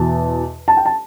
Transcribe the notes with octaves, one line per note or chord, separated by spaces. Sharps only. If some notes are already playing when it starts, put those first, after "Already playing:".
Already playing: E2 B2 A5
A5
G5
A5